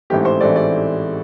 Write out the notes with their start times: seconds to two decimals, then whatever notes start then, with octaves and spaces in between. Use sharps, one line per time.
0.10 A1 G#2 E3 A3 C4 G4
0.25 C5
0.40 A1 G#2 E3 A3 C4 D5
0.56 D5